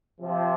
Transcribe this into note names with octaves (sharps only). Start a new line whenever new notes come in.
C3 F3